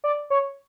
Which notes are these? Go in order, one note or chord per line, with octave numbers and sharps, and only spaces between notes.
D5
C#5